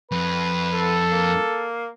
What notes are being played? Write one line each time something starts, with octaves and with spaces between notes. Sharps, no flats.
F2 B4
A4
A#3